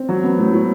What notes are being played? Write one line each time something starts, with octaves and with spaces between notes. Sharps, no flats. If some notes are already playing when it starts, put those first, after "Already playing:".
Already playing: C4
F#3
B3
A2
A2